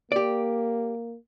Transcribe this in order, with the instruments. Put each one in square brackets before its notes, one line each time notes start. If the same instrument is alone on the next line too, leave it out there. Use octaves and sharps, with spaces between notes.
[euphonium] A#3 [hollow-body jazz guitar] G4 D5